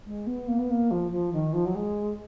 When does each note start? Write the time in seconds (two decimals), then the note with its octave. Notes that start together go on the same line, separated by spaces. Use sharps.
0.06 G#3
0.26 B3
0.47 A#3
0.58 B3
0.70 A#3
0.90 F3
1.11 F3
1.32 D#3
1.53 F3
1.65 F#3
1.75 G#3